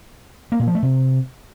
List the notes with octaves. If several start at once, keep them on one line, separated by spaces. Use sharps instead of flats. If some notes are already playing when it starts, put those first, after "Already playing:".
A#3
A#2
F3
A3
C3